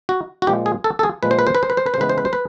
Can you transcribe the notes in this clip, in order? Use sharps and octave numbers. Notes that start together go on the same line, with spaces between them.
F#4
F#4
A#2 F3 G#3 G4
G#4
A4
A4
G#4
A#2 F3 G#3 B4
C5
B4
C5
B4
C5
B4
C5
B4
C5
C#3 E3 G#3 B3 B4
C5
B4
C5
B4